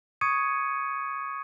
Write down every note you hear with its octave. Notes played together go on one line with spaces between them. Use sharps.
C#6 D#6 G#6 C#7 D#7